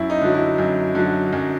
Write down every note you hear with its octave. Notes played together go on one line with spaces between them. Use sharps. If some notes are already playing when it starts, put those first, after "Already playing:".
Already playing: F#2 E4
D#4
D3 F#3
E4
F#2
D3 F#3
F#2